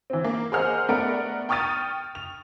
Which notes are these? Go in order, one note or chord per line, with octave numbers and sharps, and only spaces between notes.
E3 C4
A#3
G#4 A#4 C5 D#5 F#5 F6
A3 B3 A#4 D5 F#5 D7
G5 C#6 D#6 F6 A6 D#7
F7